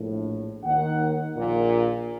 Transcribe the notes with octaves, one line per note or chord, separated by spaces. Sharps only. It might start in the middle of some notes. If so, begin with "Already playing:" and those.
Already playing: A#1 A2
D#2 D#3 F#5
A#1 A#2